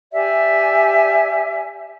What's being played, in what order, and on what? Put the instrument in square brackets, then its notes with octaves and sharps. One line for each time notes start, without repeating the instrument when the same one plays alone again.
[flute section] G4 D5 E5 G#5